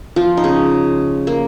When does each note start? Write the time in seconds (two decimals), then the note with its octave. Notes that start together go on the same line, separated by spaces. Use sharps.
0.16 F3 F4
0.37 D#4
0.44 C#3 C#4
1.27 A#3